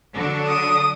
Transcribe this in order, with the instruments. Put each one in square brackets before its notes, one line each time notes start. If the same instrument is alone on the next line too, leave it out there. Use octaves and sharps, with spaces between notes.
[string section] D3 F#3 D4
[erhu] D#6